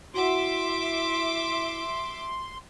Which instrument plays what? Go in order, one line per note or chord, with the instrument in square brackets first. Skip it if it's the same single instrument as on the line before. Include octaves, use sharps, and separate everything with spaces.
[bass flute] E4 [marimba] F#4 F#5 [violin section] E5 D6 [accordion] C6